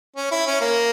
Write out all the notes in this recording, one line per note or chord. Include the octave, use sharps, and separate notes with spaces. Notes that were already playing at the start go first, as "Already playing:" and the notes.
C#4
E4
C#4
A#3